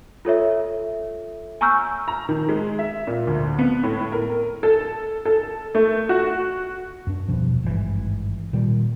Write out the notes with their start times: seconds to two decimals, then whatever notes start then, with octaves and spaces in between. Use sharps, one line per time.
0.25 F4 A4 C#5 E5
1.61 G#5 A#5 C#6 E6 F6 G6
2.08 A#5
2.29 D#3
2.49 G#3
2.79 E5
3.07 A#2
3.27 D2
3.59 B3
3.83 A2
4.12 A#4
4.63 A4
5.25 A4
5.75 A3
6.09 F#4
7.07 F#2 D4
7.28 D#1 B2 F3
7.63 G#1 G2 C#3 E3
8.53 A#2 D#3 G3